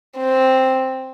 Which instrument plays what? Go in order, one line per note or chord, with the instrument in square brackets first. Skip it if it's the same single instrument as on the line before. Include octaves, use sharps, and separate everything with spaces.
[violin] C4